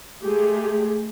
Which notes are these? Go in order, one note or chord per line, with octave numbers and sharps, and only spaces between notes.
G#3 A3 G4 G#4